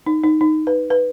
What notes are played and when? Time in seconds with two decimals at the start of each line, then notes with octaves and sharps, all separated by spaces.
0.06 D#4
0.24 D#4
0.41 D#4
0.67 B4
0.90 B4